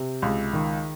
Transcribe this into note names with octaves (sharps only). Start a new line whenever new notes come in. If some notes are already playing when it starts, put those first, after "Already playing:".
Already playing: C3
C#2
D#3